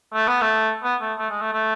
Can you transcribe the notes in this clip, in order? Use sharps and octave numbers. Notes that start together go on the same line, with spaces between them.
A3
B3
A3
B3
A3
A3
G#3
A3
A3